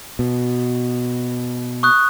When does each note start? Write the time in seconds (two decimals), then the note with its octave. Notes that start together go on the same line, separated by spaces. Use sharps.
0.19 B2
1.83 C#6 D#6 F#6